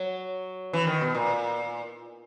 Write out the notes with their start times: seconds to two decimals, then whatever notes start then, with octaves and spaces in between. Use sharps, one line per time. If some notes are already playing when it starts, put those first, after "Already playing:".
Already playing: F#3
0.73 E3
0.87 D#3
1.01 B2
1.15 A#2